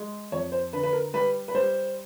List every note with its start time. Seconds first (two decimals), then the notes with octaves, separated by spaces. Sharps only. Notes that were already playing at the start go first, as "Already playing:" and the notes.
Already playing: G#3
0.32 F2 C#5
0.52 C5
0.73 D3 B4
0.83 B4
0.93 A#4
1.14 G3 B4
1.48 B4
1.54 G3 C5